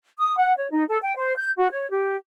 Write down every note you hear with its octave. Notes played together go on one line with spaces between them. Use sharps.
D#6
F#5
C#5
D#4
A4
G5
C5
G6
F#4
C#5
G4